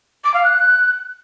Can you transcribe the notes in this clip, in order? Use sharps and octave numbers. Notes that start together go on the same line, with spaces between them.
D6
F5
F#6